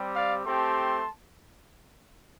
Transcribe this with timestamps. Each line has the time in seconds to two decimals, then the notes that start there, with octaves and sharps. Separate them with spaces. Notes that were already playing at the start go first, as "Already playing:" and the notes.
Already playing: G3 C4 G4
0.14 D5 F5
0.44 A3 C4 G4 A5 C6